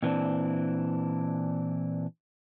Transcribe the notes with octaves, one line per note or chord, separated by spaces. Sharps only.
A#2 E3 C4 D4